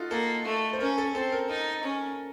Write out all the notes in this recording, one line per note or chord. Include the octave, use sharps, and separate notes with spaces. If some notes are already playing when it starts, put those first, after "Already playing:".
Already playing: D#4 F4 F#4 A4
A#3 A4
A3
C5
C#4 A#4
A4
C4 A4
A#4
D#4 A#4
C#4